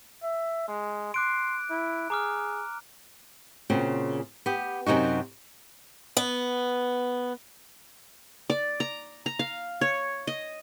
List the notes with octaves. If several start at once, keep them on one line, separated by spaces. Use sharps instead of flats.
E5
G#3
C6 D6 F#6 D7
E4
G#4 A#5 D6 F6
A#2 C#3 C4 F#4
B3 G4
F#2 C3 D#4 F#4
B3
D5
A#5
A#5
F5
C#5
D#5